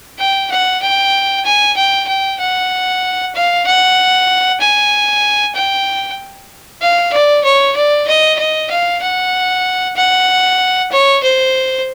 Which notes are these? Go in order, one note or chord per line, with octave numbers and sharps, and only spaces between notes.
G5
F#5
G5
G#5
G5
G5
F#5
F5
F#5
G#5
G5
F5
D5
C#5
D5
D#5
D#5
F5
F#5
F#5
C#5
C5